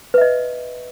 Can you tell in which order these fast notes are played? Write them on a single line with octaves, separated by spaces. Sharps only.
B4 E5 D#5